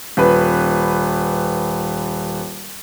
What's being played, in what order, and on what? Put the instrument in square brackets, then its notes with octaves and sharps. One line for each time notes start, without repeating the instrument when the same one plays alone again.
[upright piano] D#1 B4